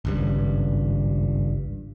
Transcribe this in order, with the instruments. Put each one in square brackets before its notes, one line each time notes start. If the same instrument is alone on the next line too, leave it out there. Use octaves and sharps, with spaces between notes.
[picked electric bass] G#1 C#2 G2